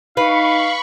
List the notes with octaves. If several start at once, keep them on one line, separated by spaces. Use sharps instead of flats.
D#4 B4 F5 B5 C#6